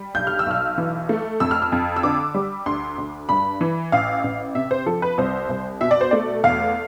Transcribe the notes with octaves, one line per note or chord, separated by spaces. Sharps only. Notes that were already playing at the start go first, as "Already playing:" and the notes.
Already playing: G3
B1 G6
F6
E6
B1 F6
E3
A3
F2 E6
F6
E6
F2
E6
D3 D6
G3
D2 C6
D2
G2 B5
E3
A1 F5
A1
C3 E5
C5
F3 A4
B4
C2 C5
C2
B2 E5
D5
C5
A3 D5
E2 F5